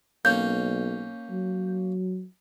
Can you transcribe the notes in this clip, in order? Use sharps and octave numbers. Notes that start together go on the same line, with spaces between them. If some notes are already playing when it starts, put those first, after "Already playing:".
B1 A#3 C#4 G6
F#3